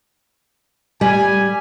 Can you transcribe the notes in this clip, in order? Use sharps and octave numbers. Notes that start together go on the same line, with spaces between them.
G3 G#5